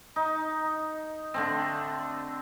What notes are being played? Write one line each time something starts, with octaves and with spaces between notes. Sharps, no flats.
D#4
D3 A3 C4